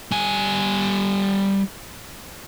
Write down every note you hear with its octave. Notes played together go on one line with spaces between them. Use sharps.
G3 G#5